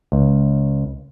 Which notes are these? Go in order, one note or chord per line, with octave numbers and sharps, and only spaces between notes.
C#2